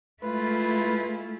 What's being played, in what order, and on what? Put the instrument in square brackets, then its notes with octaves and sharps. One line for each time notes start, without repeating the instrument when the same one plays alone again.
[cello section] G#3 E4 F4 [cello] A3 [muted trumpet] B4